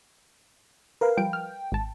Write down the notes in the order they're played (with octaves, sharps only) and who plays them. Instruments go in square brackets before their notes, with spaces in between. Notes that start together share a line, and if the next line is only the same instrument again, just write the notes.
[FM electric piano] A#4 B4 F5
[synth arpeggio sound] F3 G3 D7 [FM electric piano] G5
[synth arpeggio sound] F6
G#1 A5